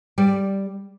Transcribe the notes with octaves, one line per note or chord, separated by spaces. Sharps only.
G3 D5